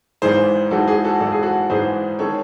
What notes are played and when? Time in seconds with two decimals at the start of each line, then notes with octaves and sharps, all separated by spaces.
0.22 G#1 G#2 E3 G#4 C5
0.71 G#1 G#2 E3 F#4 A4
0.88 G#4
1.04 F#4 A4
1.20 G#1 G#2 E3 A4
1.32 G#4
1.43 F#4 A4
1.70 G#1 G#2 E3 G#4 C5
2.19 D#3 G#3 A4 C#5